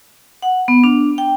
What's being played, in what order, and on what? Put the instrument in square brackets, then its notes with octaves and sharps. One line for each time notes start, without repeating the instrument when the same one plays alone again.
[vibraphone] F#5
B3
D4
G5